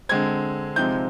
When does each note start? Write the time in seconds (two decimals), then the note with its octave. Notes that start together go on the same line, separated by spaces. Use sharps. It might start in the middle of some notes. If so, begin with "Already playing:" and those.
0.09 D3 G#3 C4 G#6
0.76 C3 F3 G#3 C4 D#4 G6